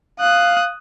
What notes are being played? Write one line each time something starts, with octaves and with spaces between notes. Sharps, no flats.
F5 D#6 F#6